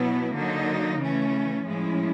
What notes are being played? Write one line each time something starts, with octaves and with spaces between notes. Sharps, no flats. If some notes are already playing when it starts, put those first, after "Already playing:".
Already playing: B2 F#3 B3 E4
D3 F#3 A#3 D#4
C#3 E3 A3 C#4
A2 F3 G#3 C#4 E4